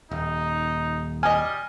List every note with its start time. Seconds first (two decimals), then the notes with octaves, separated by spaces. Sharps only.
0.11 D#1 D#4
1.23 G3 D#5 G#5 F6